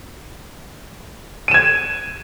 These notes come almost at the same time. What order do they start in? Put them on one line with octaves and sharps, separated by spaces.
D#7 E7 G#6